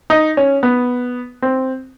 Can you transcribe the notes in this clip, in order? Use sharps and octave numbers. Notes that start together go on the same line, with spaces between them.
D#4
C#4
B3
C4